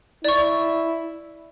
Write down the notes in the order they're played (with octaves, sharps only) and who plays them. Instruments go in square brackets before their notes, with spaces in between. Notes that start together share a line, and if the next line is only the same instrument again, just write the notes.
[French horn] E4 [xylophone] D5 C#6